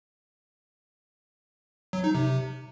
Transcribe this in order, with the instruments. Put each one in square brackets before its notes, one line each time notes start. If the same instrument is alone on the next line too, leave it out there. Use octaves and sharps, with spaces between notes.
[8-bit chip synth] F#3
D#4
C3